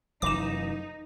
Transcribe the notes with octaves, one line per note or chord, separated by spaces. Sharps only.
F1 F#2 E3 D#4 D6 E7